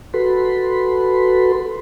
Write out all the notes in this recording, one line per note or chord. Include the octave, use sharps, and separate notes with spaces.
F#4 A4 B4 B5 C6